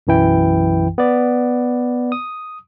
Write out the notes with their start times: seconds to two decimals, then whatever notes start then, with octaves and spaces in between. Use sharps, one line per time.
0.07 B1 F#2 E3 E4 G5
0.98 B3 D5
2.12 D#6